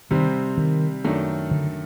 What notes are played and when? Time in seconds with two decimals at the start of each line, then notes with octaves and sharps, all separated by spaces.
0.11 C3 D#3 G3 C4
0.57 D#3
1.04 F#2 D#3 A3 D4
1.51 D3